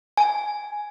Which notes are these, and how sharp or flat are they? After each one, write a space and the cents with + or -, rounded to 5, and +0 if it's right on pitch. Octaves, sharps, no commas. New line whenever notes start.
G#5 +5